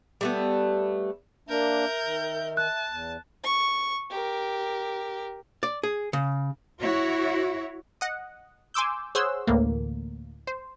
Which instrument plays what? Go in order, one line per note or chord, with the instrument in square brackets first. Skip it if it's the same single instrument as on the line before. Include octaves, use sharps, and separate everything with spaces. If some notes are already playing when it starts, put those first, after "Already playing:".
[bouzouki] G3 A3 B3
[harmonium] A#3 D4 [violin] A#4 G6 [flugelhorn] E5
[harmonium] D#3
[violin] A5 [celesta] F#6
[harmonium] E2
[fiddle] C#6
G4 A#4
[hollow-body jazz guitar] D5
G#4
C#3
[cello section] E4 F#4 C#5
[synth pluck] D#5 F#5
G#5 C6 D6 E6 G6
G#4 C5 C#5 F#5 C6 E6
D2 A2 E3 A#3
C5